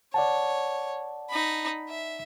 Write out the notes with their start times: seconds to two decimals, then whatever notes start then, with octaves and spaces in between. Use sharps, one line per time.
0.14 C#5 D5 F#5 A5
1.30 D#4 B5
1.90 E5